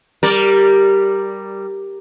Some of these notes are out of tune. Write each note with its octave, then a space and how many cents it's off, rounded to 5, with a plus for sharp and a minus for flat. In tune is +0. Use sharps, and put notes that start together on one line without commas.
G3 +0 A#4 +0 D5 -10